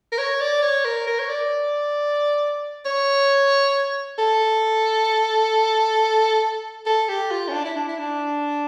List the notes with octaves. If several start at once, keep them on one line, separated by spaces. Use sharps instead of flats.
A#4
C#5
D5
C#5
A#4
A#4
C#5
D5
C#5
A4
A4
G4
F4
C#4
D4
E4
D4
E4
D4